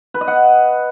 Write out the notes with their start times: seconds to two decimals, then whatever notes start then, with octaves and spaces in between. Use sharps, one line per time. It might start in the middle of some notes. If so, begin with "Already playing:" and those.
0.14 B4
0.21 D#5
0.27 F#5